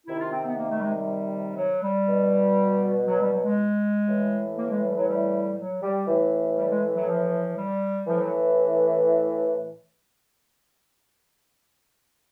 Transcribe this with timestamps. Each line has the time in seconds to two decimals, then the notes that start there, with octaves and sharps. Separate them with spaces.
0.07 C3 D#3 E4
0.20 F4
0.31 C4
0.45 B3
0.57 A#3
0.69 A3
0.78 G3
0.82 G#3
0.95 G3
1.57 F#3
1.82 G3
2.07 B2
3.07 F#3
3.20 G3
3.32 F#3
3.45 G#3
4.08 A2 E3
4.57 A#3
4.70 G#3
4.83 G3
4.95 F#3
5.08 G3
5.58 F#3
5.82 G3
6.08 A2 E3
6.57 G3
6.70 G#3
6.95 F#3
7.07 F3
7.57 G3
8.07 A2 E3 F3
8.20 F#3